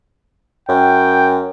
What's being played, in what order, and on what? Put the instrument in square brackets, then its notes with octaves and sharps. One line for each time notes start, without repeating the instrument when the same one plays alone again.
[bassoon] F#2 [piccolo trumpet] G5